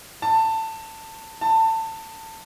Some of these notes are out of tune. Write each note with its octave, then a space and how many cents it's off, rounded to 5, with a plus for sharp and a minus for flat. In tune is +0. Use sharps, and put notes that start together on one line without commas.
A5 +15
A5 +20